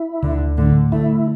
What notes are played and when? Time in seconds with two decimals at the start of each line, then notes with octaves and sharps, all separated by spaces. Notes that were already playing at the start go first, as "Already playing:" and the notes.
Already playing: E4
0.23 D2 D3
0.57 A2 D3
0.92 A3 E4